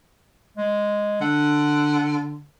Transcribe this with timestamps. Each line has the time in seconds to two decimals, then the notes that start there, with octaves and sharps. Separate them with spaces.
0.57 G#3
1.21 D3 F#5